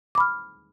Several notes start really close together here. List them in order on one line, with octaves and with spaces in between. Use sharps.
D6 B5 F6